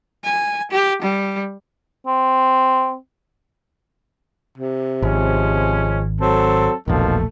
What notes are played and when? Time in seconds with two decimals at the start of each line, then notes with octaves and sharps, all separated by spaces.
0.24 G#5
0.71 G4
1.02 G3
2.07 C4
4.58 C3
5.02 G#1 F3 G#3 C#4
6.21 F#3 C4 A4
6.88 E1 A#1 B2 D#3 F3 A3